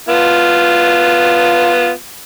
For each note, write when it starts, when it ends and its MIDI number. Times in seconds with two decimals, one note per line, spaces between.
0.09 1.90 59
0.09 1.90 65